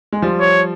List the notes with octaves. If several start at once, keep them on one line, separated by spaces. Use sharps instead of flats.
G#3
F3 G3
C#5